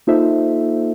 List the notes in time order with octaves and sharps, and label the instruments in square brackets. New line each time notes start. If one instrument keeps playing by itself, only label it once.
[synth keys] A#3 D#4 F4 A4 C5 E5